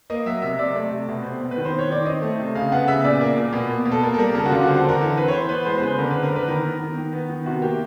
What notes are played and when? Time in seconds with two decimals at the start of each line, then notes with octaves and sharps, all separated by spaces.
0.10 A#3 D#5
0.26 F#3 E5
0.42 C3 E5
0.59 C3 D5
0.76 A3
0.91 C3
1.08 B2
1.24 C4
1.41 B2
1.51 B4
1.57 D#3
1.65 C5
1.73 C4
1.79 C#5
1.90 D#3 D5
2.05 C4 D#5
2.22 A3
2.39 C3
2.55 C#3 F5
2.72 B3 F#5
2.88 C#3 E5
3.04 A#2 D5
3.21 A#3
3.37 A#2
3.53 B2
3.69 A#3
3.85 B2
3.92 A4
4.02 A#3 A#4
4.14 A4
4.18 G3 A#4
4.35 C#3 A4
4.46 F#4
4.51 D3 F4
4.63 C4 F#4
4.76 A4
4.85 D3 A#4
5.01 E3 A4
5.17 C4 B4
5.28 C#5
5.33 E3 C5
5.49 B3 B4
5.65 G#3 C5
5.78 C5
5.82 C#3 B4
5.98 D3 A#4
6.10 C4 B4
6.23 A#4
6.31 D3 B4
6.48 D#3 A#4
6.65 B3
6.80 D#3
6.97 D#3
7.13 B3
7.29 D#3
7.45 C3 F#4
7.62 A#3 G4